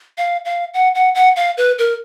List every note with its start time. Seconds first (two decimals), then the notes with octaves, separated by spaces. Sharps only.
0.18 F5
0.45 F5
0.74 F#5
0.95 F#5
1.15 F#5
1.36 F5
1.57 B4
1.79 A#4